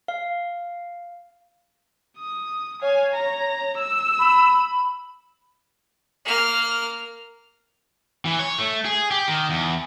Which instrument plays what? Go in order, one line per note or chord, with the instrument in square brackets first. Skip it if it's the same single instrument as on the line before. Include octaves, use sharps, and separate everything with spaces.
[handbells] F5
[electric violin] D#6
[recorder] C#5 [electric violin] F5 G#5
[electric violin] A#5
E6
[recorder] B5
[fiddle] A#3 F6
[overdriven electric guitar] E3
C#5
A3
G#4
G4
D#3
E2